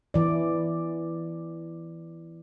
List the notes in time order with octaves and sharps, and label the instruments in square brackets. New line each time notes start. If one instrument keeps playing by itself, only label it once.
[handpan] E3 D5